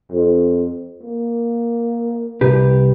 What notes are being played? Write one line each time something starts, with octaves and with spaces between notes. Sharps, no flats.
F2
A#3
C2 G4 B4